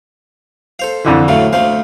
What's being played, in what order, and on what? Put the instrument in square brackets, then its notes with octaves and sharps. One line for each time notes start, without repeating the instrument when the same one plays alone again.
[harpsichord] A4 C5 F5
[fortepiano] F2 D3 E3
[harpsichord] A2 F#3 A3 [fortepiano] F5
[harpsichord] D2 A3 C5 [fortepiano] F5